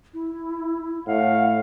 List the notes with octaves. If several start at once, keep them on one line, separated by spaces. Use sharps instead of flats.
E4
A2 F5 F#5